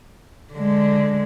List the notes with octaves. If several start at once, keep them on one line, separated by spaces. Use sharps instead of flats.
D3 G#3